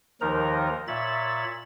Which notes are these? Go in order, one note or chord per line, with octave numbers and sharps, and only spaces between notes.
D#2 D#3 F3 D#4 A#4 A#5
A#2 C#5 E5 B5 A6